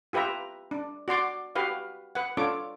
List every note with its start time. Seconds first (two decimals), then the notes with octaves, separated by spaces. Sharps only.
0.13 F4 G4 B4 E5 A#5
0.71 D4
1.08 F#4 D5 C6 D6
1.55 F#4 G4 B4 F5
2.15 B4 F#5
2.37 D4 F4 A4 C#5 D6